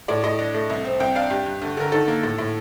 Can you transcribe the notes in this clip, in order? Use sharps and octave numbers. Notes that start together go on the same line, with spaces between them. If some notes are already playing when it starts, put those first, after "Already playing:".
A2 D5
A2 D#5
D4
A3
C2
C4
C2 G5
D4 F5
G2 G4
G2
D2
D3 A#4
D#3 A4
A#3
A2
A2